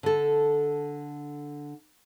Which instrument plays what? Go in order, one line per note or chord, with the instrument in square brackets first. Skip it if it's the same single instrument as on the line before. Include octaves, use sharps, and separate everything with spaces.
[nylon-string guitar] D3 A4